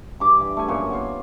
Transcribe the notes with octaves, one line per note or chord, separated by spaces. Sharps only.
G2 D6
E3
A3 G#5
F#2 A#2 F4 C#5
B3 F4